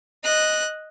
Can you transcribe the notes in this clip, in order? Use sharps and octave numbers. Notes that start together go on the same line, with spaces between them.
D#5 F#6